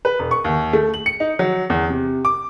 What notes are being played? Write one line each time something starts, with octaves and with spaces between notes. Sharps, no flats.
B4
E1
C#6
D#2
A3
F#7
C#7
D#4
F#3
E2
C3
D6